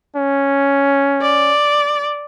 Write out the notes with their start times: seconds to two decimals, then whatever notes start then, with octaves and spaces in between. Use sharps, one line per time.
0.16 C#4
1.21 D5